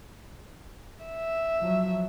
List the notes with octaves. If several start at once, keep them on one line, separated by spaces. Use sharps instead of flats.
E5
F3 F#3